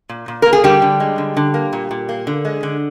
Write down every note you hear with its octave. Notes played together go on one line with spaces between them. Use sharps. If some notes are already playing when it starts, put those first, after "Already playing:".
A#2
A#2
A#3 A#4
G#4
D3 G3 G4
D3
G#3
D3
D3
A#3
A#2
A#2
A#3
D3
G#3
D3